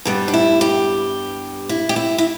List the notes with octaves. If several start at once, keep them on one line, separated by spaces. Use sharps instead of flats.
G2 G3 B3
D4
E4
G4
E4
G4
E4
E4